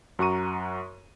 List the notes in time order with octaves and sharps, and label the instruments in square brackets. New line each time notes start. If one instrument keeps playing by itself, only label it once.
[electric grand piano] F#2 F#4 A#5 C#6 D#7